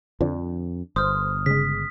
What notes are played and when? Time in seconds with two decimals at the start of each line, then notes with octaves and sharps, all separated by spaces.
0.21 F2 D3 F3 D4
0.96 G1 C5 D#6 F6
1.46 C#3 G#3 B6